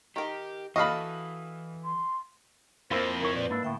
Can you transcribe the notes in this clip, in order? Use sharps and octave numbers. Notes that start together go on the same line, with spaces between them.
D#3 G4 A#4
E3 F#4 A4 D#5 F5 B5
C6
F2 F3 A#3 E4 A#4 C5
C#2 E4 A#4 C#5
A#2 B4 D5
G#2 A#3 D4 E4
D2 A2 E5 G5